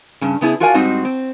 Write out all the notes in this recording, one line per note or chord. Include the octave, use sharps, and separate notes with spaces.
G2 C#3
C#3 B3 E4 G#4
F4 F#4 A#4 D5 F5 G#5
G#2 G3 C4 D#4 F#4 C5
C4